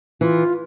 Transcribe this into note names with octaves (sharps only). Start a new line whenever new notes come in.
E3 F4